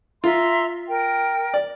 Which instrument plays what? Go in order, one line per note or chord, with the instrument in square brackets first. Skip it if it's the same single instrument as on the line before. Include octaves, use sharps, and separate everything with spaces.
[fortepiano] F4 [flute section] E5 A#5 C6
[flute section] A#4 G5
[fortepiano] D5